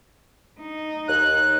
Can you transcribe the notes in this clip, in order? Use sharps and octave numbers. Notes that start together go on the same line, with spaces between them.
D#4
D#2 F#6